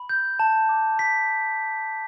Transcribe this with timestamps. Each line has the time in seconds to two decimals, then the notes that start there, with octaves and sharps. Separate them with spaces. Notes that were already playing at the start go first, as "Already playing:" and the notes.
Already playing: B5
0.09 G6
0.39 A5
0.69 D6
0.98 A5 B6